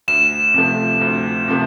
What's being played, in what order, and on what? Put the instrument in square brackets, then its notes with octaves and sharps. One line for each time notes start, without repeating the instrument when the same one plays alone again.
[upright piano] D2 [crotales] E7
[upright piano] C3 F3 A3
D2
C3 F3 A3